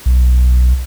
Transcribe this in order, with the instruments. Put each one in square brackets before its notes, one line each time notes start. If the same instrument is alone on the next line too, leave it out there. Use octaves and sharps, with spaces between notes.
[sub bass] B1